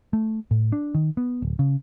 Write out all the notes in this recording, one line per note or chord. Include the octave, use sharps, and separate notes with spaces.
A3
A2
D4
D#3
B3
D1
C#3